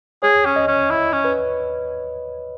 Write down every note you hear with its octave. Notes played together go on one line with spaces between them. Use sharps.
G#4 C#5
C#4
D#5
C#4
E4
C#4
B4